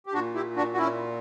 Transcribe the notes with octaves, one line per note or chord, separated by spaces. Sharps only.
G4
A#2 D4 F#4
E4 G4
D4 F#4
F#4
C#4 E4